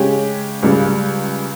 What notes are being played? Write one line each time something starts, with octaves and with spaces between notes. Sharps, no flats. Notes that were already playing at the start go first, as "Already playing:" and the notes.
Already playing: C#3 G#3 C#4 G4
C#2 C#3 G3